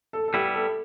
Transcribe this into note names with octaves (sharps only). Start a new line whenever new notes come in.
A4
A4
G3 B3 E4 G4
A4